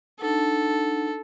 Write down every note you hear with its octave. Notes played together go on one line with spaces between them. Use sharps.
D4 D#4 A4 F#5